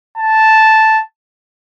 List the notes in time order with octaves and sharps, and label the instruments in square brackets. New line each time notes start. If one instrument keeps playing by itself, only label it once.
[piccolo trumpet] A5